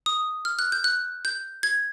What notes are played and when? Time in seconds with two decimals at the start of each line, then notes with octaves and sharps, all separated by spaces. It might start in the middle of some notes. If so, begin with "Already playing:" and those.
0.06 D#6
0.45 F6
0.59 F#6
0.72 G6
0.84 F#6
1.25 G6
1.63 G#6